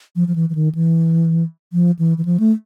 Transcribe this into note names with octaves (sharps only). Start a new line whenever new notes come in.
F3
F3
E3
E3
D#3
E3
F3
E3
E3
F3
A3